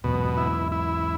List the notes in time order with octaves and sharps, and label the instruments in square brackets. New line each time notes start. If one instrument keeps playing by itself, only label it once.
[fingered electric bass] E2 G#2 [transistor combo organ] B2
[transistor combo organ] E4
E4